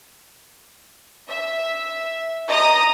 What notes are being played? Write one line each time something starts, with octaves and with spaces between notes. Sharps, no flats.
E5
D#5 A#5 D#6 A#6